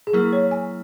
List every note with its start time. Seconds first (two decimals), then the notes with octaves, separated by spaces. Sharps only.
0.07 G#4
0.13 F#3 A#3 E4 A#4
0.33 C#5
0.51 G#5